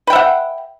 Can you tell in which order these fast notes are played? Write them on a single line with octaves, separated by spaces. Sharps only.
B4 G5 E5 F#5